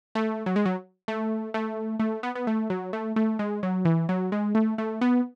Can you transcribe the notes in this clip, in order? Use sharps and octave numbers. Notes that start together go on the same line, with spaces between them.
A3
F#3
G#3
F#3
A3
A3
A3
B3
B3
A3
F#3
A3
A3
G#3
F#3
E3
F#3
G#3
A3
A3
B3